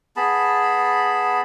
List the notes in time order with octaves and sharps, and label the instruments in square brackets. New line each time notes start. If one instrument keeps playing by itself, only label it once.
[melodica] B3 G#4 A5 B5